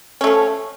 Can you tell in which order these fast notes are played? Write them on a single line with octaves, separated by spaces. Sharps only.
C#4 A3 F3